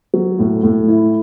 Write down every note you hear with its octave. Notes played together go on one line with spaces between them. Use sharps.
F#3
A2
A2
E4